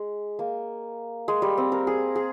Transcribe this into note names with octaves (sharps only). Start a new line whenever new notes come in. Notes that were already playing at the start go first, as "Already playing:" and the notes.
Already playing: G#3
A#3
G#3
G3
C4
A#4
G#4
G#4